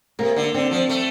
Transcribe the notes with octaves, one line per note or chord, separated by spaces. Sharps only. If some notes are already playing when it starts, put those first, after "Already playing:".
C3 A#3
D3
D3 C4
F3
A3